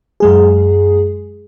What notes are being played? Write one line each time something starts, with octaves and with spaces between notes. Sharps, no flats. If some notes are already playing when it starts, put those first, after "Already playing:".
F#2 G#3 G#4